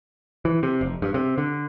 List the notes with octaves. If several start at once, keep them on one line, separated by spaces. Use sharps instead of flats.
E3
C3
F1
G2
C3
D3